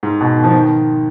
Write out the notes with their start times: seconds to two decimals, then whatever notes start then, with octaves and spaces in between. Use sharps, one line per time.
0.03 G#2
0.21 B2
0.36 D#3
0.44 F3
0.50 D#3